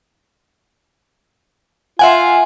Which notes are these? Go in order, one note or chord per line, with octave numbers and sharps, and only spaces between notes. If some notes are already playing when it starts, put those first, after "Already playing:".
F4 E5 F#5 G#5